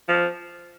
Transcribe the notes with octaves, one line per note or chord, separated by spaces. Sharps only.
F3